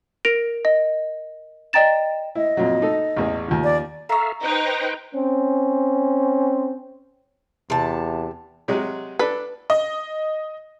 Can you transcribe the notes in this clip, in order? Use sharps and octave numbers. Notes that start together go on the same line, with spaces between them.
A#4 A#6 D7 F7
D#5
D5 D#5 G5 A#5 A6 E7
E4 D#5
F2 A#2 F#3
D#4 A4
A1 E2 G#4
D#2 F3
D5
A4 E5 F5 A#5 C#6
D#4 B4 C5 G5
C4 C#4
E2 C3 A5
C3 F#3 G#3
D4 A4 B4
D#5